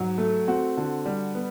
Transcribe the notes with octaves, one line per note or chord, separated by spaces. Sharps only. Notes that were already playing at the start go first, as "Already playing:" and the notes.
Already playing: G#2 F#3
A3
C4 F#4
D3
G3
B3